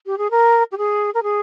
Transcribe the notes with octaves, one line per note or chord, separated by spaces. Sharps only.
G4
G#4
A#4
G4
G#4
A#4
G#4